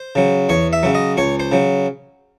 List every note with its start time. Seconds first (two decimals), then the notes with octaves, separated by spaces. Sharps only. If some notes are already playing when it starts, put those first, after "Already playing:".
Already playing: C5
0.15 C#3 F#3
0.49 E2 C#5
0.73 E5
0.83 C#3 F#3
0.95 D#5
1.17 C#2 C#5
1.40 C5
1.52 C#3 F#3